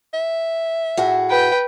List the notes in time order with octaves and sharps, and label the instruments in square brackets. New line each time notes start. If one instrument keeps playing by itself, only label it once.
[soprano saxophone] E5
[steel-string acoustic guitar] A2 F#4 G#4
[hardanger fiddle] B4 G5